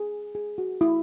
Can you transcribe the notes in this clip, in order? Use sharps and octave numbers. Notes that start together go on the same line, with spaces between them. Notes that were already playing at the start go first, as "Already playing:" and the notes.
Already playing: G#4
G#4
F#4
E4